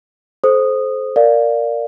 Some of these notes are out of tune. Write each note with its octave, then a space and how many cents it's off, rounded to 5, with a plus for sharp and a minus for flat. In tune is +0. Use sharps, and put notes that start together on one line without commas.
A4 -35 C5 +0 D#6 -10
A#4 -10 D5 +0 F5 +0